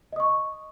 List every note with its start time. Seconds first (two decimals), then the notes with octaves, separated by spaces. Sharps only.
0.13 D#5
0.16 D#6
0.20 C#6